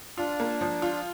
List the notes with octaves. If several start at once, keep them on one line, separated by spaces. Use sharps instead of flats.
D4 F4
A#3
F3
F4